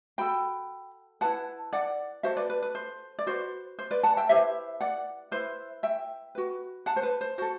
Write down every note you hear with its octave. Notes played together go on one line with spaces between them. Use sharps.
F#4 A4 G5 B5
E4 B4 F#5 A5
D5 F#5
F#4 A4 C5 E5
B4 D5
B4
B4
C5
D5
F#4 B4 C5
C5
B4 D5
F#5 A5
E5 G5
E4 G4 B4 C5 E5
D5 F#5
E4 B4 C5 E5
E5 G5
F#4 B4
F#5 A5
C5
B4
C5
F#4 A4 C5